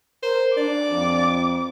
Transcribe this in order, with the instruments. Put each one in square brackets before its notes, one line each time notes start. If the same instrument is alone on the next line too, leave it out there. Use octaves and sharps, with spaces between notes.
[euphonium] A#4 [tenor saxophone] C5
[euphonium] D4 [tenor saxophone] D5 [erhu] D6
[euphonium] F2